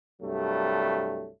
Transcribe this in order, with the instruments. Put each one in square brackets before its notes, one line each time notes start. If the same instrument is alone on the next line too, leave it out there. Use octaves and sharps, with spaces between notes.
[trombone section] C2 G2 F#3 G3 A3